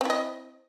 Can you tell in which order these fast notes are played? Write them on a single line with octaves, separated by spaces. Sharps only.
C4 E4 D#5